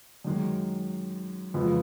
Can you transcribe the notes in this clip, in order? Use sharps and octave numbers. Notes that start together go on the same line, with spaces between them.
F#2 D#3 G#3
F2 C#3 F3 G#3 B3